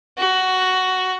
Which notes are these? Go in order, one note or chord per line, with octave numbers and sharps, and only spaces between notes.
F#4